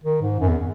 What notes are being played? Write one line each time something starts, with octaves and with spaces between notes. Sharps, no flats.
D#3
G#2
F#2
E2